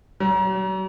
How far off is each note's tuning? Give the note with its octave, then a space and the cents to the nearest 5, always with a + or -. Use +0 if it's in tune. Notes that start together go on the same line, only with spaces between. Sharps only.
F#3 +40